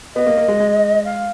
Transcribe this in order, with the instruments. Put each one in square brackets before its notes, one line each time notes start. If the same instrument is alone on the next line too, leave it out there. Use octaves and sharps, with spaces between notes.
[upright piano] B3 [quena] D#5
[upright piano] A#3
A#3
G#3
G#3
[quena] F5